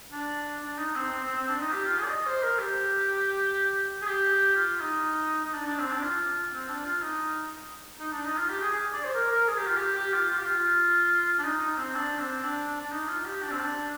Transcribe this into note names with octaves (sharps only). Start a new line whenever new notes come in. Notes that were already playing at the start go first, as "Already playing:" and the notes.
D4
D4
D#4
C4
C4
C4
C4
D4
D#4
G4
F4
G#4
D5
D#5
C5
A#4
G4
G#4
G4
F4
D#4
D#4
D4
D4
C4
D4
F4
C4
D4
F4
D#4
D#4
D4
D#4
F4
G4
G#4
G#4
D5
C5
A#4
A#4
G#4
G4
F4
G4
G4
F4
F4
G4
F4
D4
D#4
D#4
C4
D4
C4
D4
D4
D#4
F4
G4
D4
C4
D4